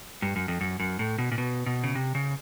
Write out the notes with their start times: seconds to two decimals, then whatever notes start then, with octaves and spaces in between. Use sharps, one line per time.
0.22 G2
0.36 F#2
0.48 F2
0.61 F#2
0.80 F#2
0.99 A2
1.18 B2
1.32 A#2
1.38 B2
1.66 B2
1.84 C#3
1.95 C3
2.15 C#3